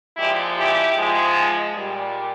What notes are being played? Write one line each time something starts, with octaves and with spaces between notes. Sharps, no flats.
A#2 F3 G#3 E4 G4
E4 G4
G#2 F3 G#3
A#2 G3